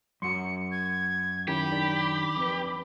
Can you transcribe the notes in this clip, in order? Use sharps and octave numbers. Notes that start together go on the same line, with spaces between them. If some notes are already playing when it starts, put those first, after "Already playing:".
F#2 F#4 C6 C#7
G#6
D#3 C#4 E4 G4 B5
D#3 D4 D5
F2 B4 D6